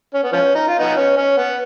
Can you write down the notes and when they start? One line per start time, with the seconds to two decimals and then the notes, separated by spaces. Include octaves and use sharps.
0.14 C#4
0.23 B3
0.32 F3 C#4
0.55 D#4
0.67 F4
0.79 B3 D#4
0.97 C#4
1.17 C#4
1.38 B3